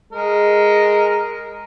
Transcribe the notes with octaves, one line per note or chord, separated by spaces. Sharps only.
G#3 A#4